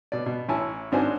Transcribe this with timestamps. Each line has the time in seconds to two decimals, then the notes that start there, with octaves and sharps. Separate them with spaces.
0.12 B2 D5
0.26 B2
0.49 A1 E4 C#5 G#5 A5
0.92 G#1 C#4 D4 F#4 C5 G#5